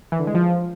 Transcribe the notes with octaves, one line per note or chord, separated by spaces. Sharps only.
E3
D3
G#3
F3